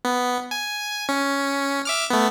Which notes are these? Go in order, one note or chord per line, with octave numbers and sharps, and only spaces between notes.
B3
G#5
C#4
E5 D6 F6
A3 B3